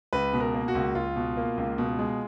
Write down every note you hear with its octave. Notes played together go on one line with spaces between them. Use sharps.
C#2 B4
B2
A#4
A#3
F#4
C#2
C#2 F4
B2
A#3
C#2
B2
G#3